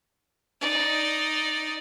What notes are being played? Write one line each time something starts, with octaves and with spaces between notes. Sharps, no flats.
D#4 D5